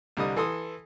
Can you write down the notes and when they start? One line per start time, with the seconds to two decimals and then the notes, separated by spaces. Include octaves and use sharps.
0.17 C2 D3 G3 D#5 D#6
0.37 E3 A4 C6 D#6